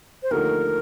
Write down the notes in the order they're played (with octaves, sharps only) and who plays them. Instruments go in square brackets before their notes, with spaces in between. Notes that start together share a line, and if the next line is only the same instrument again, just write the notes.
[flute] C5
[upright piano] D#2 D3 F3 A3 D#4 [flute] A#4